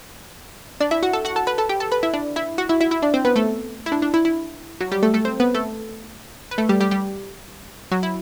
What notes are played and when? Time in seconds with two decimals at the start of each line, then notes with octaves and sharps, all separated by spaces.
0.81 D4 D5
0.91 E4 E5
1.03 F#4 F#5
1.13 A4 A5
1.25 F#4 F#5
1.36 A4 A5
1.47 B4 B5
1.58 A4 A5
1.69 G4 G5
1.80 A4 A5
1.92 B4 B5
2.03 E4 E5
2.14 D4 D5
2.36 E4 E5
2.58 F#4 F#5
2.69 E4 E5
2.81 E4 E5
2.91 E4 E5
3.02 D4 D5
3.14 C4 C5
3.25 B3 B4
3.36 A3 A4
3.86 E4
3.92 D4
4.02 D4
4.14 E4
4.25 E4
4.81 F#3 F#4
4.91 G3 G4
5.03 A3 A4
5.14 A3 A4
5.25 C4 C5
5.40 B3 B4
5.55 A3 A4
6.51 B4
6.58 A3 A4
6.69 G3 G4
6.80 G3 G4
6.91 G3 G4
7.92 F#3 F#4
8.03 E4